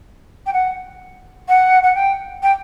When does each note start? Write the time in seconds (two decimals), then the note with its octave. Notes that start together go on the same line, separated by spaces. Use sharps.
0.46 G5
0.53 F#5
1.48 F#5
1.83 F#5
1.94 G5
2.42 G5